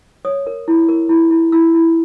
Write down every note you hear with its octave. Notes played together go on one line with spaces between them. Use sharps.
C#5 D#6
A#4
E4
A#4
E4
E4
E4 E6
E4